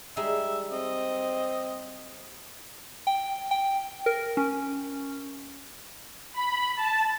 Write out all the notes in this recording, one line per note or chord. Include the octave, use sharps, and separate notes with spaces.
G3 G#3 D#4 E5
C4 D#5
G5
G5
A#4
C#4
B5
A5